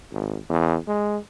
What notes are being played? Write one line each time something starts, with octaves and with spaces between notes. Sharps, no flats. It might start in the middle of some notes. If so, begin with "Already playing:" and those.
G#1
E2
G#3